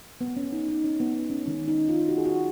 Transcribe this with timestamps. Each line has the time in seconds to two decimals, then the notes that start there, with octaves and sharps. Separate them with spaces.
0.21 B3
0.37 C#4
0.52 D#4
0.68 D#4
0.84 C#4
1.00 B3
1.16 B3
1.30 C#4
1.46 D#3 G#3 C#4
1.68 D#4
1.89 F4
2.09 F#4
2.18 G#4
2.25 F#4